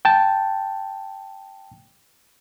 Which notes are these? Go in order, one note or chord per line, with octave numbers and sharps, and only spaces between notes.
G5 A5